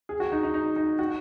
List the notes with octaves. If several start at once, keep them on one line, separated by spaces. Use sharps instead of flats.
G#4
F#4
D#4
D#4
D#4
D#4
F#4